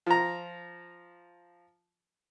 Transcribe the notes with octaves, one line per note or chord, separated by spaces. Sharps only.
F3 A#5